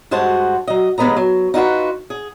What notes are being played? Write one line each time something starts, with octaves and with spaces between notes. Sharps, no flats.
G2 G#3 F#4 C5 A5
F#3 D#5
D#2 G#3 B3 B4 D#5 A#5
F#3
D#4 F4 F#4 B4
G#4